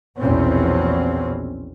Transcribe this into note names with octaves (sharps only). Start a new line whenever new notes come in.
A#1 E2 B2 C4 C#4